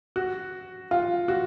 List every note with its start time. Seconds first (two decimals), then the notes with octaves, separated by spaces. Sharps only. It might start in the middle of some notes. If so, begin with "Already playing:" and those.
0.16 F#4
0.91 F4
1.28 F#4